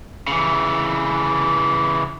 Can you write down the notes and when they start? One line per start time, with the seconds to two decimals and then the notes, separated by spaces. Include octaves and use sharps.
0.28 C#3 E3